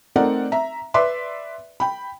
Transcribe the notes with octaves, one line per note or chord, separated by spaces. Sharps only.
A3 C4 D#4 A#4 D5 F#5
E5 A#5
B4 D5 E5 C6 D6
G5 B5